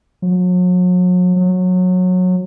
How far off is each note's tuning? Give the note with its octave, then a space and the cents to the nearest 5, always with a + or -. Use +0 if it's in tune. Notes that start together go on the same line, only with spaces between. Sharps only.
F#3 -40
F#3 -20